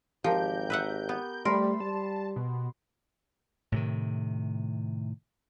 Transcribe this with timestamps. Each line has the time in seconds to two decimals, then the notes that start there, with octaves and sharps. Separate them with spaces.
0.24 G#1 F3 G4 A#4 G6
0.70 B4 E5 F#5
1.09 B3
1.45 G3 A3 A#4 B5 C6
1.80 G3 A5
2.36 B2
3.72 A2 C3 D#3